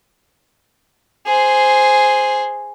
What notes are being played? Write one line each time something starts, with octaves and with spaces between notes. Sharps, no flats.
G#4 C5